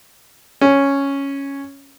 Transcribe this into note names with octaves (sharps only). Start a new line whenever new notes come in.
C#4